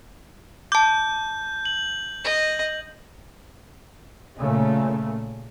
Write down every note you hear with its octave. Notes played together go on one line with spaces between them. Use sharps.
A5 D6 G6
F#7
D#5
A#2 C#3 A3